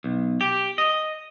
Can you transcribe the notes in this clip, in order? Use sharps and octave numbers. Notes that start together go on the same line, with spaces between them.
B1
G4
D#5